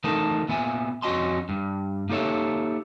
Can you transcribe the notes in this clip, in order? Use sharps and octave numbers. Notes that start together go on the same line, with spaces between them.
E3 A3 D#4 A4 A#4 A5
A#2 B3 E5 G#5
F2 C#4 F#4 D#5 A5 C6
G2
A#3 D#4 G4 A4 C#5 E5